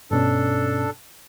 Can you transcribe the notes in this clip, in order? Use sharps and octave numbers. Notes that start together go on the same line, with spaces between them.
G2 B2 C#4 D4 A4